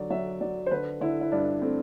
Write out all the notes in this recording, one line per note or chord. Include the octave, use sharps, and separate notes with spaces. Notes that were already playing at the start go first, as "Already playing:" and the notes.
Already playing: D3 F#3 D5
F#3 E5
F#3 D5
C5
D3 B4
D3 E4
E4
G2 D4
A3 C4